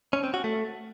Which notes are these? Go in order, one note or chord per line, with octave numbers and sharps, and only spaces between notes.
C#4
C4
F#4
A3